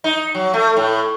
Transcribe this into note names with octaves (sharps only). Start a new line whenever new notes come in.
D#4
F#3
A3
A2